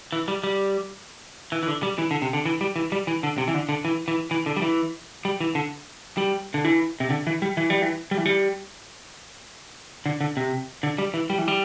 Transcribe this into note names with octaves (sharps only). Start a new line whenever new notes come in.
E3
G3
G3
E3
E3
D3
G3
E3
D3
C3
D3
E3
G3
E3
G3
E3
D3
C3
E3
D3
D3
E3
E3
E3
D3
G3
E3
G3
E3
D3
G3
D3
E3
C3
D3
E3
G3
E3
G3
E3
G3
E3
G3
D3
D3
C3
D3
G3
E3
G3
E3
G3